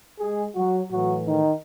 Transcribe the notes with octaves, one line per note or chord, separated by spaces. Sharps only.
G#3 G#4
F#3 F#4
A2 E3 F#3 F#4
D#3 D#4